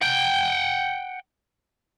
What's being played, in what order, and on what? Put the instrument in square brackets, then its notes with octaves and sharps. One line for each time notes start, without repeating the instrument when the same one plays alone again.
[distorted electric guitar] F#5 G5